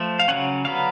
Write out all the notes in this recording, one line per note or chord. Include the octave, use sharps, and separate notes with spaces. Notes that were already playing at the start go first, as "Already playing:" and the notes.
Already playing: F3 A3
F5
C#3 F#3 C#4 F#5
D3 F#3 B3 F5